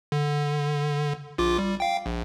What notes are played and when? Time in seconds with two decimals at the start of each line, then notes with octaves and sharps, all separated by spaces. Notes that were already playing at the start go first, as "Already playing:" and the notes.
0.12 D3
1.38 A#1 F4 D6
1.58 G3
1.80 F5 G5
2.06 A#1